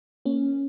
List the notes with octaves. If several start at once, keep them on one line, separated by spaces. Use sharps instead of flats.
A#3 C#4